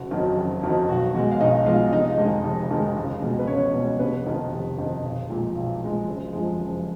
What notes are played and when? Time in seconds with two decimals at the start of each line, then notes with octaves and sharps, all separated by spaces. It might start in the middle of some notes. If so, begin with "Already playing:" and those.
Already playing: F#1 F#4
0.11 F2 D#3 F#3
0.36 F#1
0.63 F2 D#3 F#3
0.89 B1 F#4
1.14 B2 G#3 F#4
1.31 F5
1.40 B1 D#4 D#5
1.66 B2 G#3 F4 F5
1.93 F1 D#4 D#5
2.18 F2 D#3 G#3
2.44 F1
2.71 F2 D#3 G#3
2.97 C#2
3.22 B2 G#3
3.39 B4
3.47 C#2 C#4 C#5
3.74 B2 G#3
3.99 F1 B3 B4
4.26 F2 D#3
4.52 F1
4.78 F2 D#3
5.03 B1
5.29 A#2 F3 G#3
5.55 B1
5.81 A#2 F3 G#3
6.08 F#1
6.33 F2 F3 G#3
6.59 F#1